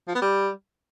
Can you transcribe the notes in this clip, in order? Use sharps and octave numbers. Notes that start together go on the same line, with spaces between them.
F3
B3
G3